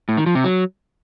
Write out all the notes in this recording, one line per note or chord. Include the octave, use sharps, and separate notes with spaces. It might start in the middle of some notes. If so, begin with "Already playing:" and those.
A2
D#3
F3
C3
F#3